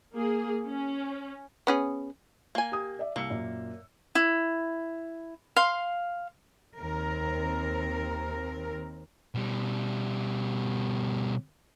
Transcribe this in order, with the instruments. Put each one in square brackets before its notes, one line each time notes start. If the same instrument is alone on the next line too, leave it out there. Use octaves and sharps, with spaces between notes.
[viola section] A#3 G#4
C#4
[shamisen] B3 C#4 G#4
[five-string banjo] A#3 G#5
[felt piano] G4 D#6
D5 E5
[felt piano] C2 E6 C#7 [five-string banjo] A#3
[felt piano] F#2 A#2
[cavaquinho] E4
F5 C6
[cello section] D#2 C4 A#4
[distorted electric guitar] B2 G3